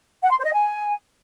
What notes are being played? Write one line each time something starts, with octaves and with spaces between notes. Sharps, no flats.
F#5
C6
C5
D#5
G#5